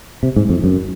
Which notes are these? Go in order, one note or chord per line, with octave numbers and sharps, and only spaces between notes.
C3
G#2
F2
F#2